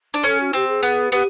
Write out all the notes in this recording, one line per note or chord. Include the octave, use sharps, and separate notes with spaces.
D4
C#4 A4
F#4
C4 G4
G#4
B3
B3 G4